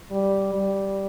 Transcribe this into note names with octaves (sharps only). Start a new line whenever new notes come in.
G3
G3